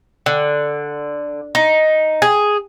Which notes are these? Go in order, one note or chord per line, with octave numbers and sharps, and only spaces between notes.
D3
D#4
G#4